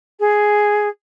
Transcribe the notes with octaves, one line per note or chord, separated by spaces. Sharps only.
G#4